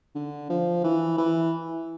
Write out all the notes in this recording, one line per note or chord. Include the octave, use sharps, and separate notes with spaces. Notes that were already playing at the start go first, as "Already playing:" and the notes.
D3
F3
E3
E3